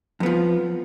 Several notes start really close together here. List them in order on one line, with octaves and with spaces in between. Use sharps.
F2 B3 F3